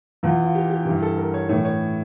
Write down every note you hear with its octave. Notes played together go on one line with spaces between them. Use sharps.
E2 E3 F4
F4
G4
G4
G2 E3 G4
A4
A#4
C#5
A2 E3 C#5
C#5